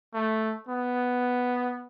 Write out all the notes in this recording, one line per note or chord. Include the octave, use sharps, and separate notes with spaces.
A3
B3